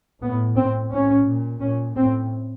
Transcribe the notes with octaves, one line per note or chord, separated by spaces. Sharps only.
A2 B3
A2 C4
A2 C#4
A#2
A#2 C#4
A2 C4